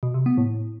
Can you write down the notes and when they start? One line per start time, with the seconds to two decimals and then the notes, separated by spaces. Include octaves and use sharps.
0.03 B2
0.14 C3
0.26 B3
0.38 A2